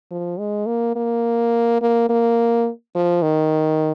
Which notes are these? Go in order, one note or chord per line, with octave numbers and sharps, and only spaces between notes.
F3
G#3
A#3
A#3
A#3
A#3
F3
D#3